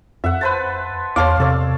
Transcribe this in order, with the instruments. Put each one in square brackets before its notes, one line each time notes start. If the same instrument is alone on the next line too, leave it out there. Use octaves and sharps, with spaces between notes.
[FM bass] F2 [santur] E5 F#5
[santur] B4 C5 A5
[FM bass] E2 [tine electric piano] C#5 A5 D6 [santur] F5 C6
[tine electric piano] C3 [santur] A4 C#5 D5